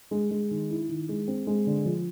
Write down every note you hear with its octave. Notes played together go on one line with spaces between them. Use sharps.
G#3
G#3
D#3
E4
D#3
G#3
C4
G#3
D3
F3